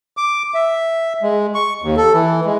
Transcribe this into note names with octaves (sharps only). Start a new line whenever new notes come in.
D6
E5
G#3
C#6
D#2
A4
E3
G#3